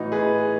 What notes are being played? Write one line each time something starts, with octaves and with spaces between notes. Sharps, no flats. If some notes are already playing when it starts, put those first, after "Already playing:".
Already playing: A2 E3 D#4 F#4
G#4 B4